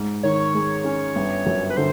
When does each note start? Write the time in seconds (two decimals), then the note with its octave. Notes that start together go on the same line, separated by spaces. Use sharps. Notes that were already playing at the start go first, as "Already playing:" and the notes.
Already playing: G#2
0.23 D#3 C#5
0.54 G#3
0.84 C#4
1.16 G1
1.46 F#2
1.70 B4
1.77 D3 C5